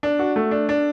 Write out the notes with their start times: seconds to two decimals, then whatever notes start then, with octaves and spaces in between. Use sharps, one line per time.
0.03 D4
0.19 F#4
0.36 A3
0.51 D4
0.69 D4